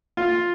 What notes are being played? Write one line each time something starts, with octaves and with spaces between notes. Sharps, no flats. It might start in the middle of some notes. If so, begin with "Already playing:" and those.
F4